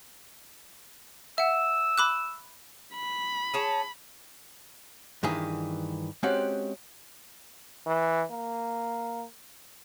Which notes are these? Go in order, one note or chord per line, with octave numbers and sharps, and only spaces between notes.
E5 F#5 E6
B5 D6 F#6
B5
G#4 C#5 A5
G2 D#3 E3 G#4
G#3 C4 C#4 F#4 G4 F#5
E3
A#3